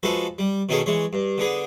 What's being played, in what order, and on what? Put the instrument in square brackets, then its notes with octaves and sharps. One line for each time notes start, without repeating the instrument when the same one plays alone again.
[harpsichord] F3 G#3 F#4 A4 B4
G3
B2 D#3 C#4 D#4 G#4 A4
E3 G#3 C#5
G2
D3 B3 G#4